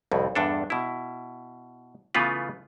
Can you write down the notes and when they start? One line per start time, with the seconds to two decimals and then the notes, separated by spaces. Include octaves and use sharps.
0.12 C2 F2 A2
0.35 E2 G2 D4 A4
0.70 B2 E4
2.14 C#3 E3 A3 B3 F4 B4